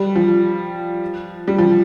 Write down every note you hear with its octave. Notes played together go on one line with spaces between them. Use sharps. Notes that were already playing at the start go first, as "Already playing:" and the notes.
Already playing: G3
F3
G3
F3